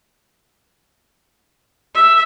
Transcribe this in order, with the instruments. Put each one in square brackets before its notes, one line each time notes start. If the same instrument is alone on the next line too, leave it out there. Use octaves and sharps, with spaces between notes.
[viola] E5